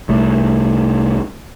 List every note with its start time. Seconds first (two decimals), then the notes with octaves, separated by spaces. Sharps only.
0.09 C2 A3